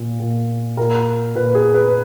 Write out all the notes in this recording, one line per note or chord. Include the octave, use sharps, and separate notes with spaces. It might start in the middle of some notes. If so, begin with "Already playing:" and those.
Already playing: A#2
A#2
A#2 A#4
A#2 B4
G#4
B4